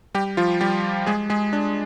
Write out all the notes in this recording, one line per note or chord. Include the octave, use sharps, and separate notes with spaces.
G3 G4
F3 F4
G3 G4
G#3 G#4
G#3 G#4
D4